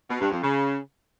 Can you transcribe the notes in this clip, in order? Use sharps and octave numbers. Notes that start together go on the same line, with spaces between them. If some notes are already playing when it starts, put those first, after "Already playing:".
B2
G2
F2
C#3